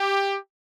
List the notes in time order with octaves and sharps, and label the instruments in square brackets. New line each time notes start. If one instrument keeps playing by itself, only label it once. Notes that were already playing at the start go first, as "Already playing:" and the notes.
Already playing: [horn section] G4